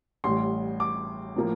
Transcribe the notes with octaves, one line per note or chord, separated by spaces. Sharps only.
A1 A2 G3 C6
D6
A2 F3 A#3